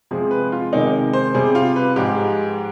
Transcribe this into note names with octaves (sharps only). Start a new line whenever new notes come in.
C3 F3 G#3 G#4
B4
F4
C3 D#3 G#3 D#4
C5
C3 G3 G#4
F4
B4
G#2 F3 G#3 G4